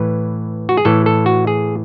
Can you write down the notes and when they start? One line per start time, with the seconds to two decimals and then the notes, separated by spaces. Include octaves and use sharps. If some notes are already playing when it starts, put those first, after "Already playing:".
Already playing: A2 E3 B4
0.69 F#4
0.77 G#4
0.85 A2 E3 A4
1.06 A4
1.26 F#4
1.47 G#4